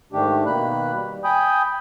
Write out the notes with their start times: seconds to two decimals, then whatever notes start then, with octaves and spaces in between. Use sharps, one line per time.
0.13 G#2 D#3 A3 D4 G4
0.46 B2 D#3 A#3 B5 F#6
0.93 G3
1.24 G5 G#5 B5 D#6 G6